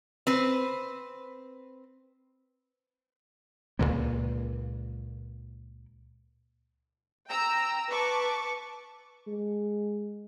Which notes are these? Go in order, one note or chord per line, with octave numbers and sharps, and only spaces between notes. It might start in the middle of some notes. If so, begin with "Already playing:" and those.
C4 B4 C5
C#2 G2 A#2 A#3
G5 A#5 E6
B4 A5 C#6 D6
G#3